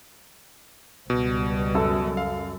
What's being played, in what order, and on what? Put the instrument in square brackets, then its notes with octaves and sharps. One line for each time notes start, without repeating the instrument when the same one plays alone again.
[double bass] C#2 G3 [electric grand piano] B2
[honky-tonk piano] F#2 A4 E6
[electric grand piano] F5